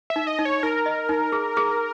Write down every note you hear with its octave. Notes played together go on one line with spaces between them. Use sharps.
E5
D#4
D#5
D#4
C#5
D#4 A#4
D#5
D#4
G#4
G#4